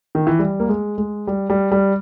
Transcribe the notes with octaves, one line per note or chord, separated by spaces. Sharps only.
D#3
E3
G3
A#3
G#3
G#3
G3
G3
G3